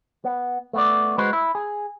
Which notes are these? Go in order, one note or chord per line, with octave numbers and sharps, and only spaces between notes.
B3
A3 B3 D5
G#3 F#4 B4 C5
E4
G#4